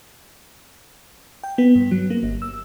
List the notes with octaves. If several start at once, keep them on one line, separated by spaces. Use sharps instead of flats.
G5
B3
G2
F#3
A#3
G1
E6